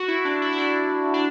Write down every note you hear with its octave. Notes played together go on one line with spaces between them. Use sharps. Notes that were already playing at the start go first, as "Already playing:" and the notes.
Already playing: F#4
E4
D4
E4
E4
D4
D4